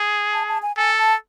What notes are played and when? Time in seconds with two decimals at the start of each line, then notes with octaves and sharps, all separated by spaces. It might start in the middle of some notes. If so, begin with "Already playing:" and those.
Already playing: G#4
0.33 A5
0.48 A5
0.62 G#5
0.76 A4 G#5
0.98 A5